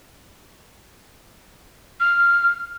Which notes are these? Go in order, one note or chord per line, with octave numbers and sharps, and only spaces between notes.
F6